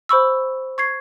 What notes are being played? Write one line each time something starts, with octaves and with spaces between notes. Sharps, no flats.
C5 B5 C#6 E6
C#6 G#6 C7